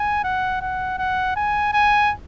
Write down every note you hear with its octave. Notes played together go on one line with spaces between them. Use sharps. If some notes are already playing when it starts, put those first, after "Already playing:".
Already playing: G#5
F#5
F#5
F#5
G#5
G#5